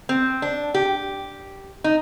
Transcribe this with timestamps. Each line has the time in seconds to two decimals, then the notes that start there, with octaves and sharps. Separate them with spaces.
0.09 C4
0.42 D4
0.74 G4
1.84 D#4